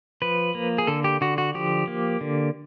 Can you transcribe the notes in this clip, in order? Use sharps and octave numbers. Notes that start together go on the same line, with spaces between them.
F3 B4
A#3
G#4
D3 A4
G4
D3 F#4
F#4
F3 G4
A#3
D3